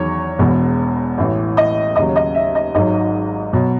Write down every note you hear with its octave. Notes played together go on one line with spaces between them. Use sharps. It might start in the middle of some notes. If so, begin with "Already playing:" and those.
Already playing: E2 D#3 F#3 C#5
E1 E2 B2
A1 A2 E3
D#5
D#2 C#3 F#3 D#5
D#5
E5
D#5
G#1 G#2 D#3 F#3 D#5
B2 F#3